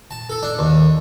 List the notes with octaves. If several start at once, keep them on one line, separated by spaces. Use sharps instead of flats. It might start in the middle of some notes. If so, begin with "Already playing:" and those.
A5
A4
D4
D#2